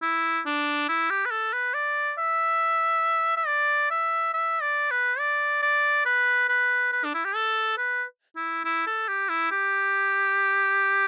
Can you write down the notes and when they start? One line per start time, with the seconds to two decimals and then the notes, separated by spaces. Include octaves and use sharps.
0.02 E4
0.46 D4
0.88 E4
1.10 G4
1.26 B4
1.31 A4
1.53 B4
1.74 D5
2.18 E5
3.36 E5
3.47 D5
3.90 E5
4.33 E5
4.62 D5
4.91 B4
5.19 D5
5.62 D5
6.05 B4
6.49 B4
6.92 B4
7.04 D4
7.14 E4
7.25 G4
7.35 A4
7.78 B4
8.36 E4
8.64 E4
8.86 A4
9.08 G4
9.29 E4
9.51 G4